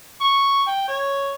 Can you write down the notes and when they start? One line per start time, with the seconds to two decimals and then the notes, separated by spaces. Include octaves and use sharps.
0.21 C#6
0.68 G5
0.88 C#5